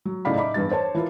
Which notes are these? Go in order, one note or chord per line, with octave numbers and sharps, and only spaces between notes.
F#3
A2 C#3 D#4 D5 F5 B5
D#4 E5 B5 D6
E2 G2 G3 A6
C5 C#5 A5
E3 E4 F4 A#4